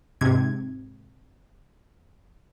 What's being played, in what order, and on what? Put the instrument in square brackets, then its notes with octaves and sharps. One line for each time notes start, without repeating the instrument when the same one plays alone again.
[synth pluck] G#2 C3 G#6